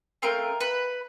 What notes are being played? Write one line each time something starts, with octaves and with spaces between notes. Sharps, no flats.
A3 C4 F4 A#4
B4